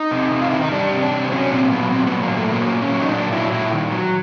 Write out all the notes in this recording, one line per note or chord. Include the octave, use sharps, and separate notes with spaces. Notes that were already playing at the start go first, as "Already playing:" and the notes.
Already playing: D#4
C3
C3
F4
D#3 E4
D#4
G3 D4
C3
D4
C3
C4
F#3 C#4
A#2 C4
F#3 B3
A#2 C4
B3
F#3
A#3
A#2 A3
F#3 A#3
A#2
C#4
F#3
D#4
A#2 D4
F#3 E4
A#2 E4
D#3
F#3